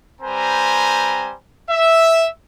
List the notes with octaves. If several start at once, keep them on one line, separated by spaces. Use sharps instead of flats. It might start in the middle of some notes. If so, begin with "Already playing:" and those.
G3 C4 B4 C5 G#5 A#5
E5